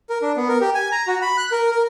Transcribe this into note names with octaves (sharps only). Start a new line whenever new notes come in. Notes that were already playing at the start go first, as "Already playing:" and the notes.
A#4
D4
B3
A#4
G4
G#5
A#5
F#4
B5
F#6
A#4
A#4